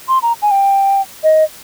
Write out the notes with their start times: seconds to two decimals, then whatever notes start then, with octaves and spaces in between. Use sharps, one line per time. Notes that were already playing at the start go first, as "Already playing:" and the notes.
0.08 C6
0.23 A#5
0.42 G#5
0.51 G5
1.24 D#5